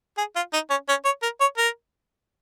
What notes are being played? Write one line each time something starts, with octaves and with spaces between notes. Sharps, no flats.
G#4
F4
D#4
C#4
C#4
C#5
A#4
C#5
A#4